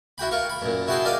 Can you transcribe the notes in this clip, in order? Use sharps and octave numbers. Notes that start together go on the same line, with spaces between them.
E4 F#4 G5 B5
F4 A#4 C#6
B5
F#2 A#2
E4 F#4 G#4 G5 A5 C6
A#4 D5 D#5 F5